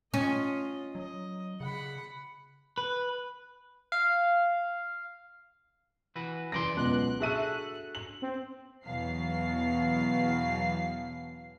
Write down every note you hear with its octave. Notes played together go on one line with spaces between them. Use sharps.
C#4 F4 D#5
F#3 D#5
C#3 F#5 B5
B4
F5
E3 F#4 B4
F#2 E3 D5 C6 A#6
C#2 B2 F#6
D4 F#4 G#4 A4 E5 D#7
F#7
C4
E2 B2 E3 F#3 F5 C7